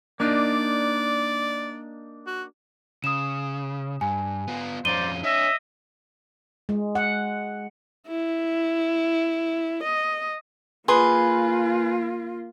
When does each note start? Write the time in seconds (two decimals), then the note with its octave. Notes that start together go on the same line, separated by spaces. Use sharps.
0.20 A#3 D4 D#4 D5
2.27 F#4
3.04 C#3 D#6 E7
4.01 G2 G#5
4.48 B3 F4
4.85 F2 C#4 D#4 F4 C5 D5 D#7 G7
5.23 D4 C#5 D#5 E5
6.69 G#3
6.95 F#5
8.08 E4
9.84 D#5
10.88 A#3 F4 G#4 B4 C6